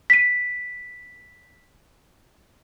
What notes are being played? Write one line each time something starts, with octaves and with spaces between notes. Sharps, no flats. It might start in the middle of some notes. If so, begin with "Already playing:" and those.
B6 D#7